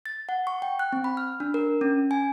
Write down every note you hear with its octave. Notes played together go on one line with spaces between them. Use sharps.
A6
F#5
C#6
G5
F#6
C4
B5
F6
D4
A#4
C#4
G#5